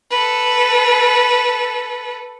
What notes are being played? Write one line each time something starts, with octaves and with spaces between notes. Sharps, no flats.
A4 B4